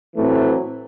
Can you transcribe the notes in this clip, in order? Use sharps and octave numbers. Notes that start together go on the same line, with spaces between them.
A2 E3 F#3 A3 C4